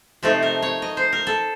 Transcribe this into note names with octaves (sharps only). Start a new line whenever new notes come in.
C3 F3 A3 D#4 A4
A#4
C#5
D#5
C5
A#4
A4